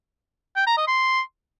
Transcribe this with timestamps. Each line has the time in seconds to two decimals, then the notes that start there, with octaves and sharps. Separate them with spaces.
0.56 G5
0.67 A#5
0.77 D#5
0.88 C6